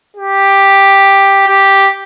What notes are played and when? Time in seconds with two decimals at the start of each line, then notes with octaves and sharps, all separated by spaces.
0.17 G4
1.47 G4